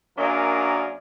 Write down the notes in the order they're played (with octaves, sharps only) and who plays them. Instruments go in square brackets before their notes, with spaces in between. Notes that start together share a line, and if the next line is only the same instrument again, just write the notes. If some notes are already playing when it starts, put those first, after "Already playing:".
[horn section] F#2 F#3 A#3 D4 G#4 A#4